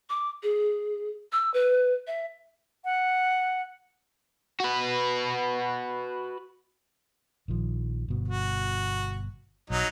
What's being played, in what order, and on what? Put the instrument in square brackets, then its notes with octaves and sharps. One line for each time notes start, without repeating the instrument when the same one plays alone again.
[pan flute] D6
G#4
E6
B4
E5
[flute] F#5
[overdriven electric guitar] F#4 B4
[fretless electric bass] A#1 D#3 F3
G1 B2
[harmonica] F#4
[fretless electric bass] B1 [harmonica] F#3 D#4